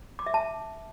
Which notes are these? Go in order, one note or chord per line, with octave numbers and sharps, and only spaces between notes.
D6
E5
A5